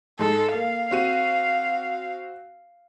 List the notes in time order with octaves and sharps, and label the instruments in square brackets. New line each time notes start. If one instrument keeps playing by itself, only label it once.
[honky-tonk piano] G#2 G#3 [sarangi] A4
[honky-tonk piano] A#3 [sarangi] F5
[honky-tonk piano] C4 F#4 D#7